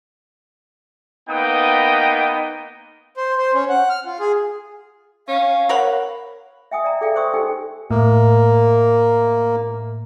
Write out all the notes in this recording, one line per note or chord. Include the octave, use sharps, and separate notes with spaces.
A#3 B3 D#4 B4 G5 D#6
C5
C5
C#4
F#5
F6
F4
G#4
C#4 F5
A#4 C#5 F#5 B5
E5 G5 G#5 D#6
D5 E5 G#5 A#5
G#4 A4 D5 E5 F5 G5
C5 C6 C#6 D#6 E6
D#4 G4 A4 G5 G#5
A2 A#3